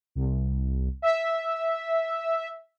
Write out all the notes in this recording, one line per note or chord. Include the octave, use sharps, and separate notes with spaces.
C2
E5